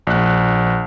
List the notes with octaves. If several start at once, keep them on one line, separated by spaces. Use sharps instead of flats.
A#1 F#6